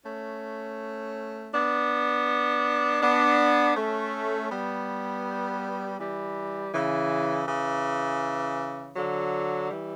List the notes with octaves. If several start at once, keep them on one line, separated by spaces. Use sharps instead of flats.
A3 C#4
B3 D4
B3 D4
A3 C#4
G3 B3
E3 G3
C#3 E3
C#3 E3
D3 F#3
E3 G3